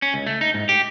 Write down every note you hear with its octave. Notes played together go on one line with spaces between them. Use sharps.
C#4
C#2
A3
D#4
G#2
G4